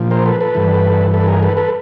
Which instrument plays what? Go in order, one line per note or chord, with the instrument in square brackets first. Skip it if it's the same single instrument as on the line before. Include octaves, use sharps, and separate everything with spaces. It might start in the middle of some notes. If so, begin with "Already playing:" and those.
Already playing: [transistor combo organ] A#2 F3
A#4 C5
A4 B4
A4 B4
G2 E3
A4 B4
G#4 A#4
A4 B4
A4 B4